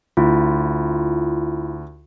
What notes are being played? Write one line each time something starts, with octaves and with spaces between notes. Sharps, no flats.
D2 E4 F4